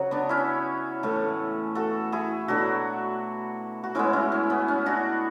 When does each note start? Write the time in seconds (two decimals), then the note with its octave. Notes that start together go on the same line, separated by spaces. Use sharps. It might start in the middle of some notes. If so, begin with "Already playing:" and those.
Already playing: C#3 F#3 F#4
0.11 B3 D4
0.29 C#4 E4
1.03 A2 E3 A3
1.75 F#4 A4
2.12 E4 G#4
2.48 B2 F#3 A3 D4 F#4
3.84 F#4
3.95 A2 G#3 B3 C#4 E4
4.13 C#4 E4
4.32 C#4
4.50 B3
4.68 C#4
4.86 D4 F#4